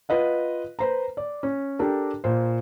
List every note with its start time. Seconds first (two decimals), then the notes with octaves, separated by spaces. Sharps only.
0.09 F4 B4 D#5 F#5
0.79 B4 C5 A#5
1.17 D5
1.43 C#4
1.79 D4 G4 A4 A#4
2.24 A#2 C5